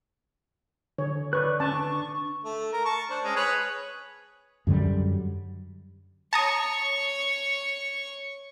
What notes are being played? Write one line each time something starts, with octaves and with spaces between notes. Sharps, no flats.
D3 C#5
B4 D5 C#6 F#6
C#4 B4 A5 C#6
D4
A3
A#4
A5 C#6
D4 C5
G#3 C#4
G#4 B4 C#5
F#2 D3 F#3 G3
C#5 A5 A#5 C#6 D#6